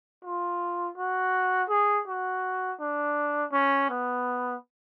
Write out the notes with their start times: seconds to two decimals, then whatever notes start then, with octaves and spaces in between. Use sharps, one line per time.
0.24 F4
0.98 F#4
1.70 G#4
2.07 F#4
2.80 D4
3.52 C#4
3.90 B3